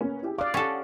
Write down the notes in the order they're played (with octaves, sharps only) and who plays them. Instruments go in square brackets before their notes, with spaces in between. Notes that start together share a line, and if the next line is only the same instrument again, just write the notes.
[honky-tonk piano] A#3 B3 C#4
E4 G4 G#4
[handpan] D5 F5 [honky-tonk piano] D6 D#6 F#6
[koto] C#4 A4 [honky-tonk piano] G4 F#5 A5